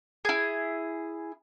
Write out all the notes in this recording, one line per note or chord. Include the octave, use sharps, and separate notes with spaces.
E4 G#4